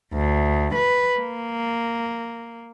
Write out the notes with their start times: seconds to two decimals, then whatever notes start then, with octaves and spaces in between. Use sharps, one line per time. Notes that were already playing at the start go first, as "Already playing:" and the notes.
0.13 D2
0.74 B4
1.19 A#3